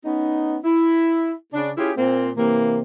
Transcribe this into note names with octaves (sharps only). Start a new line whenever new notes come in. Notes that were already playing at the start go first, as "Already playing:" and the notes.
B3 C#4 D#4
E4
C#3 D4
C#4 E4 F4 G4 G#4
A#2 A#3 C4
C3 E3 A#3